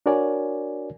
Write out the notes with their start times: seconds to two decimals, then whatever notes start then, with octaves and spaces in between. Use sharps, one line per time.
0.06 D4 F#4 A#4 C#5 D5 G#5